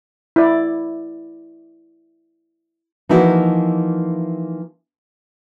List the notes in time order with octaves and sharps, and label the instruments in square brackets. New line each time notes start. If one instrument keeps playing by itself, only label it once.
[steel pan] E4 D5
[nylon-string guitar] E3 F3 A#3 D#4 E4 F#4